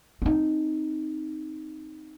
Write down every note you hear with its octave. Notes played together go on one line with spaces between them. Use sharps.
C4 D#4